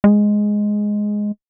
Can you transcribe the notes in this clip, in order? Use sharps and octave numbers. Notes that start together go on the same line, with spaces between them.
G#3